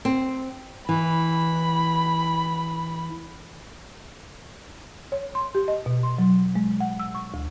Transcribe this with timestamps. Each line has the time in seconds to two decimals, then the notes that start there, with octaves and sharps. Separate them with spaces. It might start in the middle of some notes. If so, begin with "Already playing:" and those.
0.05 C4
0.89 E3 B5
5.12 C#5
5.35 C6
5.55 G4
5.68 D#5
5.86 B2
6.03 C6
6.18 F#3
6.55 G#3
6.80 F#5
7.00 E6
7.15 C#6
7.34 D2